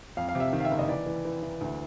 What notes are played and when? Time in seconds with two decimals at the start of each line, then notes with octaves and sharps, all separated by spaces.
0.17 F2 F5
0.29 F5
0.35 C3
0.40 E5
0.53 D#3
0.60 F5
0.65 E5
0.71 F#1
0.79 D#5
0.88 E3 D5
1.06 E3
1.25 E3
1.43 E3
1.61 D2